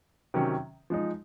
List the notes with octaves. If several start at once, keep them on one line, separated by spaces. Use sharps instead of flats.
C3 D#3 F#3 C#4
F3 G#3 D#4